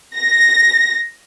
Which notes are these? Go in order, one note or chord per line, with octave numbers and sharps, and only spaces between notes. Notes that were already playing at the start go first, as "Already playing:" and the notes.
A#6